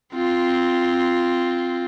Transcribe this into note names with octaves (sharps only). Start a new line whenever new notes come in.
C4 F4